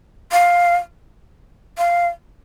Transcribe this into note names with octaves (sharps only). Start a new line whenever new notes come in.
F5
F5